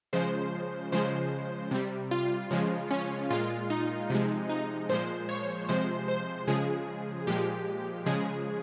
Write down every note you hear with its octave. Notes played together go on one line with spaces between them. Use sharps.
C#3 F3 G#3 C5
C#3 F3 G#3 C5
C3 G3
F4
C#3 F3 G#3
C#4
A#2 G#3 F4
D#4
C3 F3 G#3
D#4
A#2 F3 G#3 C5
C#5
C3 F3 G#3 C5
C5
C#3 F3 G#3 G#4
A#2 F3 G#3 G4
C#3 F3 G#3 G#4